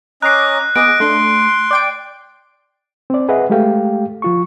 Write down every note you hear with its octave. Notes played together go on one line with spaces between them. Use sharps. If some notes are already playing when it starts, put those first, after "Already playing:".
C#4 D#5 A#5 D6 F#6 C7
B3 G#4 D#5 D6 D7
A3 D4 C6
D5 G5 D7
C4 D5
G#4 B4 D#5 E5 F#5
G#3 A3 G4 A4 F5 G5
F3 F4 C#6